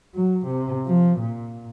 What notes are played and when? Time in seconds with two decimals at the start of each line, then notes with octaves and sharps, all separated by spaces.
0.15 F#3
0.47 C3
0.86 F3
1.19 A#2